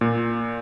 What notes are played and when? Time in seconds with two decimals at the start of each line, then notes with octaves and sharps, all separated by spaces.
0.01 A#2